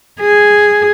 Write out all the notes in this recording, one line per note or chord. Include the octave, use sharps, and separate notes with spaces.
G#4